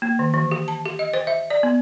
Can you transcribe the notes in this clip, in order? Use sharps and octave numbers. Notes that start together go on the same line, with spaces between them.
A#3
D#3
E3
G4
A5
G4
D#5
C5
E5
D5
B3